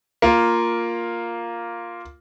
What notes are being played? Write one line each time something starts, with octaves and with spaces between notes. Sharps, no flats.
A#3 F4